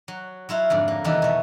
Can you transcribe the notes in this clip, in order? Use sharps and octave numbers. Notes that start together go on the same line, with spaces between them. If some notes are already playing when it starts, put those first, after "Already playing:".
F#3
F#3 E4 F4 F5
F2 G#2 D3
A#3
E2 C3 D#3 E3 G3 D#4
B2 A3